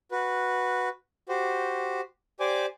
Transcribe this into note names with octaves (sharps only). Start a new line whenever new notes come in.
F#4 B4
F#4 G4 C5
G4 C5 D5 G#5 D6